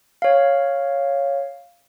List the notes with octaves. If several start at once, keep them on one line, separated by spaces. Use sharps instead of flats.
C#5 F5